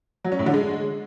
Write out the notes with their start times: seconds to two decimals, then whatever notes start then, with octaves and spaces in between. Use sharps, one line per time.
0.25 F#3
0.32 C#4
0.39 A2
0.46 D3
0.54 G#3